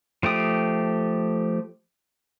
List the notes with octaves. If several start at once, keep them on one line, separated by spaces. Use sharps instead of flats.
F3 A3 G4 D#6